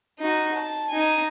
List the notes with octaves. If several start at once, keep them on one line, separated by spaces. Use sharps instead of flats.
D#4 F#4
A5
D#4 G#5